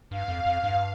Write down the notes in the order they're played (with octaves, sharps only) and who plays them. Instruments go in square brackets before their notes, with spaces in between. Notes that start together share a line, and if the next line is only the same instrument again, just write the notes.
[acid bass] G2 [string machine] F5
[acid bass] F2
F2
G2